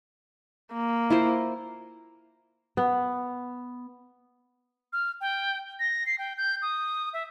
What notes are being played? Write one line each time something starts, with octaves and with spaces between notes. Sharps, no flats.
A#3
E4 F4 C5
B3
F6
G5
A#6
C7
G5
G6
D#6
E5